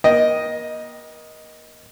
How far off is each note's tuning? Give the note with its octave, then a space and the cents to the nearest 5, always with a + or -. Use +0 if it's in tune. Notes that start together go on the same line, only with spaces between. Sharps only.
A#3 +35 D#5 +0 G5 +0